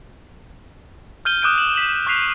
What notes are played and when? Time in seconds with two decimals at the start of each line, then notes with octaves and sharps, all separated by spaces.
1.25 F6 G6 D#7 G7
1.42 D6 D#6 F#6 G6 D7 D#7
1.58 E7 F#7
1.75 B6 F#7 G7
2.07 C#6 F#6 G6 B6 C7 F7